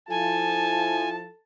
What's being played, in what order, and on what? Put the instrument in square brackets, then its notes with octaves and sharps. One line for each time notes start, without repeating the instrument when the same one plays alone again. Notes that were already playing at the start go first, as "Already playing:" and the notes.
[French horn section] F3 E4 F4 [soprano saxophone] A4 [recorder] G#5 [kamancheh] A5